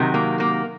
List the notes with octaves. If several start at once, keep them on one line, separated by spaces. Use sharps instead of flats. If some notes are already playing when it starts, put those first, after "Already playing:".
Already playing: C3 D#3 F#3
A#3
A#3